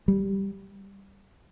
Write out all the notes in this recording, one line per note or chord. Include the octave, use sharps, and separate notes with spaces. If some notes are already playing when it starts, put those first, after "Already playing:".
G3